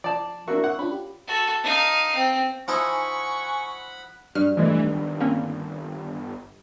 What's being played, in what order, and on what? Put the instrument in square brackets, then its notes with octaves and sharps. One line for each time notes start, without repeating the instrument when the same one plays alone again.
[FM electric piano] F3 [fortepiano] D5 A5
[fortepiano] A#3 D4 F#4 [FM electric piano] A#4 E5 C#6
[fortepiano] F#5
[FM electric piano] C#4 D4 F4 [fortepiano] B5
[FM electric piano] G4
[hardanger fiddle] F#4 A4
D#4 F5
C4
[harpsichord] F3 D#4 E4 [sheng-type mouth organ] F#5 B5 [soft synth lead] G#5 [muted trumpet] C#6
[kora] G2 [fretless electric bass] D4 [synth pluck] F6
[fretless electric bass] D1 C2 A3 [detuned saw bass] E3 [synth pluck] F3 G#3
[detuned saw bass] G1 [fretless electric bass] D#3
[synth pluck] A#3 C4 C#4